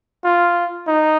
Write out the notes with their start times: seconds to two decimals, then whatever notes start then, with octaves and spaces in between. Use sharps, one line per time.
0.24 F4
0.87 D#4